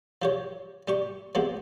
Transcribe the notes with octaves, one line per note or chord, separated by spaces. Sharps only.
F3 G4 C#5
G3 G4 C#6
F3 G#3 B3 C4 G4